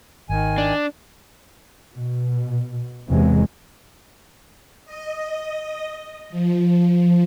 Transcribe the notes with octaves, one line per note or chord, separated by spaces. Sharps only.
G#1 D#3 G#5
D4
B2
E2 C3 E3 F#3 G#3
D#5
F3